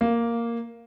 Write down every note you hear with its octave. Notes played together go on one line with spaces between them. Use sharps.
A#3